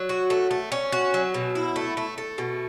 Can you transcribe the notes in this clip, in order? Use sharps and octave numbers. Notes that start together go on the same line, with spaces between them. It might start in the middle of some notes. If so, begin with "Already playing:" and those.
Already playing: F#3
F#4
A3
A3
C#4
F#4
F#3
B2
E4
A3
A3
A3
B2